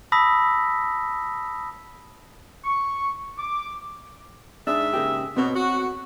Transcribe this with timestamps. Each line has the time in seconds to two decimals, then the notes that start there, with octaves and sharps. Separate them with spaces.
0.12 A5 B5 D#6 E6 A#6 B6
2.64 C#6
3.39 D6
4.67 G#2 D4 G#4 E5
4.94 C#3 A#3 G4
5.37 B2 C4 A4 C#5
5.55 F#4